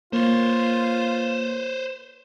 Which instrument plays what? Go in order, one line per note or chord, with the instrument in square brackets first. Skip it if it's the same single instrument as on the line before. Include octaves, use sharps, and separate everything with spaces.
[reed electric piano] A#3 [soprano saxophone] F4 [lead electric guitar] C5 C#5